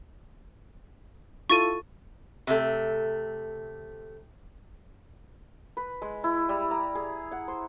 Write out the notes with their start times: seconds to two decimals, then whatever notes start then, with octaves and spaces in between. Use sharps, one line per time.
1.50 E4 F4 A4 C#6 A6 D#7
2.47 C3 A3
5.77 B4
6.02 G#3
6.24 E4
6.49 G3
6.71 A#5
6.95 G#4
7.32 F#5
7.48 C5